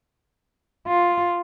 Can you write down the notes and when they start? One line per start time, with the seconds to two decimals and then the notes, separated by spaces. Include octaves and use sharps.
0.88 F4